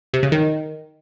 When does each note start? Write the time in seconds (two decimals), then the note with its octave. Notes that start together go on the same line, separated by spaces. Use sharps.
0.14 C3
0.23 C#3
0.32 D#3